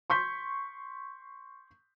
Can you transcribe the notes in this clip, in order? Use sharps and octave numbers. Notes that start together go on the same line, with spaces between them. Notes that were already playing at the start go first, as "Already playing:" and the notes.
C6 C#6 G6 B6